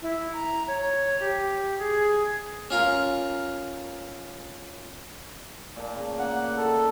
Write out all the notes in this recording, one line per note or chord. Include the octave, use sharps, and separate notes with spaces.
E4
A#5
C#5
G4
G#4
C#4 F4 A#4
A#2 A5
C#3
A#3 F#5
D#4 E4 A4